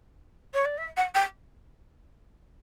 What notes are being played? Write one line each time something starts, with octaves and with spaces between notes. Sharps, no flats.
C#5
D5
E5
F#5
G5